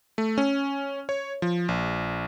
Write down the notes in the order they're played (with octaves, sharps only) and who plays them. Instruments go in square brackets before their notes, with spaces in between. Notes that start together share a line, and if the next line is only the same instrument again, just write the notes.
[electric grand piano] A3
C#4
C#5
F3
A#1